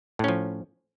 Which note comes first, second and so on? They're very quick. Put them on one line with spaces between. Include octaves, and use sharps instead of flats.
A2 C#4 F3